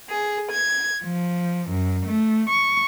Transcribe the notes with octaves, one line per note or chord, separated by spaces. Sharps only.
G#4
G#6
F3
F#2
A3
C#6